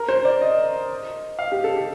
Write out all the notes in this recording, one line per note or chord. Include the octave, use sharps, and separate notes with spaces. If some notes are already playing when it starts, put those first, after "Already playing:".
Already playing: A#4
C5
D5
D#5
F5
G4
A4
G4